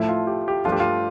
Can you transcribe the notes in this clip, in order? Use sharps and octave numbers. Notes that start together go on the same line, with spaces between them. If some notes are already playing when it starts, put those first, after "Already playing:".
Already playing: A2 F3 A3 E4
F4
G4
G4
G2 F3 A3 D4 F4
G4
F4